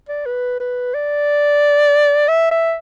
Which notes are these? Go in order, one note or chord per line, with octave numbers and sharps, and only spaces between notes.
D5
B4
B4
D5
E5
E5